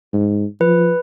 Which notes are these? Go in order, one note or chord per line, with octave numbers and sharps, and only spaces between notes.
G#2
F3 B4